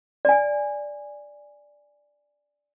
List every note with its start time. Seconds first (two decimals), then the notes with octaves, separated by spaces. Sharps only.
0.25 D5 G#5